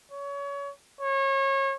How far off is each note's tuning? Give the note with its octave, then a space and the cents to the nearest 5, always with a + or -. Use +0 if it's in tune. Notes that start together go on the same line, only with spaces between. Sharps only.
C#5 +25
C#5 -30